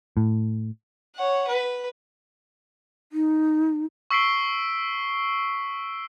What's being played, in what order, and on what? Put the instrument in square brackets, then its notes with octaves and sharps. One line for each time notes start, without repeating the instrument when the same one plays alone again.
[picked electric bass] A2
[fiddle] C#5 F#5
B4
[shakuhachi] D#4
[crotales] C#6 E6 B6 C7 D7 G7